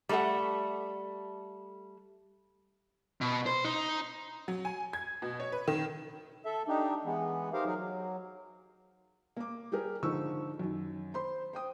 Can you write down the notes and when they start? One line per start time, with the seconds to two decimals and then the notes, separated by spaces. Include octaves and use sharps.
0.09 G3 A3 A4 E5 F#5
3.21 B2
3.46 C5
3.64 D#4
4.48 F#3
4.65 G#5
4.93 G#6
5.22 B2
5.40 C#5
5.52 B4
5.68 D#3
6.45 A4 E5
6.68 D4 D#4 G4
7.05 E3 G#3 B3
7.53 D#4 G4 A#4 C5 F5
7.65 F#3 D#4 G#4 A#4
7.77 F#3
9.37 A#3 D6
9.72 G3 G4 G#4 A#4
10.03 G#2 D3 F3 D#4 C#6 E6
10.59 F#2 D#3
11.14 C5 B5 C6
11.53 C5 G5 D#6